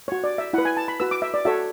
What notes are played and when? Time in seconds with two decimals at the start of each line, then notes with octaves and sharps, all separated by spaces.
0.08 F#4 C#5
0.24 D5
0.38 E5
0.53 E4 B4 F#5
0.65 G#5
0.77 A5
0.88 B5
1.00 F#4 B4 E6
1.11 D6
1.22 E5
1.34 D5
1.45 F#4 A4 C#5 E5